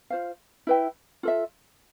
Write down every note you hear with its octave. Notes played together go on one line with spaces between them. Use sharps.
F4 C5 F5
E4 B4 E5 G5
F4 A4 E5